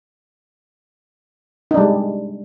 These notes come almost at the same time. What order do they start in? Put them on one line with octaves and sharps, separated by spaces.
D#4 D4 G3 G#3